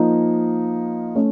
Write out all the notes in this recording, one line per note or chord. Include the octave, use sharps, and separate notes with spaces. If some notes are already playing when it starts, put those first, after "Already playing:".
Already playing: F3 A#3 D#4
A3 C#4